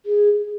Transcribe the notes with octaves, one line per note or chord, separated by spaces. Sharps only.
G#4